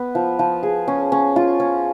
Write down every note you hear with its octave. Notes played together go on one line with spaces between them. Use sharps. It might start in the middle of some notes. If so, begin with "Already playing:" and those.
Already playing: B3
F3
F3
G#4
C#4
C#4
F4
C#4